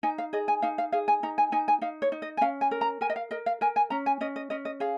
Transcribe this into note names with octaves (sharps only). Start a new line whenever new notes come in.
D#4 G#5
F5
G#4 D#5
G#5
D#4 F5
F5
G#4 F5
G#5
D#4 A#5
G#5
D#4 G#5
G#5
D#4 F5
C#5
D#4
D#5
G#5
C#4 F5
G#5
A#4
A#5
A#4 G#5
D#5
F5
A#4 D#5
F5
A#4 G#5
G#5
C#4 A#5
G#5
C#4 D#5
D#5
C#4 D#5
D#5
G#4 F5